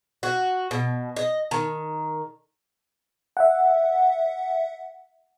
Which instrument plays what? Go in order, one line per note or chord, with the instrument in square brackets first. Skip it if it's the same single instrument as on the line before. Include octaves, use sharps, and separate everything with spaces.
[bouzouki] F#4
B2
D#5
D#3
[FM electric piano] E5 F#5